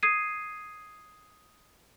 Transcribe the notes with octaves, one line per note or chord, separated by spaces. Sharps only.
D#6 G#6 C7 D#7